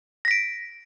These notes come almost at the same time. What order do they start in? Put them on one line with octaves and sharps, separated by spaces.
A#6 B6 D7